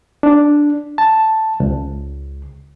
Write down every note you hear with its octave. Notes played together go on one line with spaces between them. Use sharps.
D4
A5
C#2